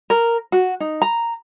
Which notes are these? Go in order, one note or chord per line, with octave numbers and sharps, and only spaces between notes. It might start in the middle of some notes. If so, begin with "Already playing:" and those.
A#4
F#4
D#4
A#5